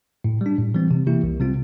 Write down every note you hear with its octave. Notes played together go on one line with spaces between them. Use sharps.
A2
G3 D4
A2
E3 G3 C4
C3
E3 A#3 E4 G4
C2
C3 G3 C4 F4